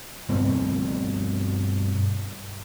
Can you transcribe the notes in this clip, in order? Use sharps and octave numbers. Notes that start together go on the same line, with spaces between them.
G2 B2 D#3 C4